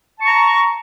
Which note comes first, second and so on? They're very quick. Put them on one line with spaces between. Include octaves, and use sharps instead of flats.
A5 C#6 A#5